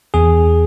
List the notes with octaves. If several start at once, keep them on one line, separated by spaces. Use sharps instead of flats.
E2 G#4